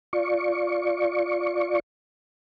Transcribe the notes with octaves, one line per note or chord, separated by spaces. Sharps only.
F4 D5 C#6